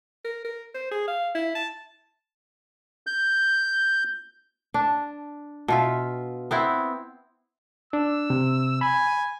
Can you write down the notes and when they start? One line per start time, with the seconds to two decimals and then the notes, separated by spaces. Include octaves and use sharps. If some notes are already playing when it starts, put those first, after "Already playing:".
0.24 A#4
0.44 A#4
0.75 C5
0.91 G#4
1.08 F5
1.35 E4
1.55 A5
3.07 G6
4.74 D4
5.68 B2 F4 E5
6.51 B3 C4 E4
7.93 D4 E6
8.30 C3
8.81 G#5 B5